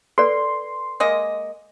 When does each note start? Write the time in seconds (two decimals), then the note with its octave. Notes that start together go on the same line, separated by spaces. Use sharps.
0.18 A4 B4 D5 C6
1.00 G#3 A#3 D#5